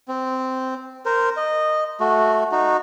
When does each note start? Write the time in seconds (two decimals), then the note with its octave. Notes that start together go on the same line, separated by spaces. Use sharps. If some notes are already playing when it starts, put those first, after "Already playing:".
0.08 C4
1.06 A#4 C5
1.37 D#5
2.00 A3 F#4
2.52 D#4 F#4